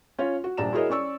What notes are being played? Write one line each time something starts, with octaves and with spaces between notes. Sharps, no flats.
C#4 F4 C#5
F#4
D#1 A#1 D4 A#5 E7
E4 F#4 G#4 A#4 C#5 D#5
C#4 D5 C#6 E6